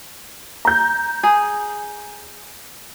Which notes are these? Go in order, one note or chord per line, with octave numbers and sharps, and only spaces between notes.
A#5 G6
G#4